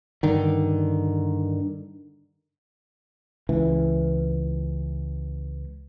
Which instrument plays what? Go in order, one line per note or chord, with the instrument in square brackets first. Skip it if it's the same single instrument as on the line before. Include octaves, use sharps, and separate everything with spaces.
[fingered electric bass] G2 D3 D#3
[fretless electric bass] C#2 E3